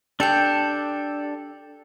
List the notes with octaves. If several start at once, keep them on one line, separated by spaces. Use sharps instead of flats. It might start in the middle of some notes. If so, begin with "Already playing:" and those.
D4 G4 A4 G5